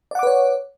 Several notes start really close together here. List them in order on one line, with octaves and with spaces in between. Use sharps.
D5 F#5 D6 B4 C#5